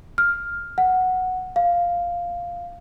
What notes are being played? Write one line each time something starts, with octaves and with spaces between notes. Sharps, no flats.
F6
F#5
F5